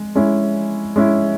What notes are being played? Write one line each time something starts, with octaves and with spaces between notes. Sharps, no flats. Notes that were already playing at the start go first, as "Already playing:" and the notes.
Already playing: G#3
G#3 C#4 E4
G#3 C#4 E4